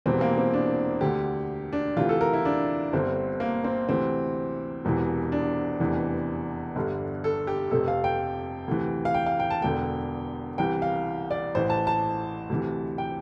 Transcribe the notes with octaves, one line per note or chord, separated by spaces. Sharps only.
E1 E2 C3 E3 C4
A#3
C4
D4
D2 D3 G4
D4
D2 C3 E3 F4
A4
A#4
E4
D4
G1 G2 D3 C4
A#3
C4
D2 C3 E3 C4
E1 E2 C3 E3
D4
F1 E2 C3 E3
G1 G2 D3
A4
G4
F1 F2 C3 A4
F5
G5
D2 C3 E3
F5
G5
F5
G5
A5
E1 E2 D3 G5
C2 C3 E3 G5
F5
D5
A1 A2 E3 C5
A5
A5
D2 C3 E3
G5